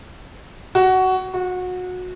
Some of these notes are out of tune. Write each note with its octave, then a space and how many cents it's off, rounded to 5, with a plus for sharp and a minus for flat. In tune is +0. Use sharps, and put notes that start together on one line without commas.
F#4 +15
F#4 -25